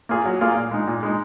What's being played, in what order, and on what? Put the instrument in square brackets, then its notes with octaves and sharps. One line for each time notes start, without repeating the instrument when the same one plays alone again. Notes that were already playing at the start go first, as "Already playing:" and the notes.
[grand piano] A#3 F4 G#4
F#3
A#3 F4 G#4
A#2
G#3 D#4
A#2
G#3 D#4